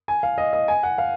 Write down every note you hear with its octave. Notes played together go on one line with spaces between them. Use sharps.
G#5
F5
D#5
D#5
G#5
F#5
F5